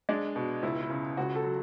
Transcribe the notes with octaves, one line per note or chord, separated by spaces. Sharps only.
G#3 D4
B2
C#2 E4
E4
C#3
C#2 F#4
A4
F#3